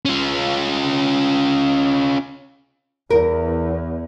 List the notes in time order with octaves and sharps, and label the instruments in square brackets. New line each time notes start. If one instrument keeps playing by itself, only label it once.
[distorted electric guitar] C#4 F4
[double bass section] E2 [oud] A#4